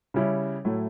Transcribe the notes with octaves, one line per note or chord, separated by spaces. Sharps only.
C#3 G3 C#4 E4
A2 F#3 A3 E4